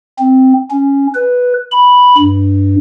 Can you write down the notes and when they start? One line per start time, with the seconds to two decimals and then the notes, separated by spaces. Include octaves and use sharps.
0.19 C4
0.71 C#4
1.14 B4
1.71 B5
2.18 G2